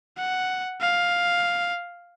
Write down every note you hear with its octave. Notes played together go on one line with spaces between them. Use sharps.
F#5
F5